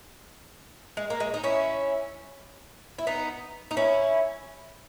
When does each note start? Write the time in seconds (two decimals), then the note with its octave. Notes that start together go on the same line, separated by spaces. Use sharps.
0.97 G#3
1.10 A#3
1.20 G#3
1.34 D#4
1.44 C#4 E4
2.98 E4
3.07 B3 D#4
3.71 D#4
3.77 C#4 E4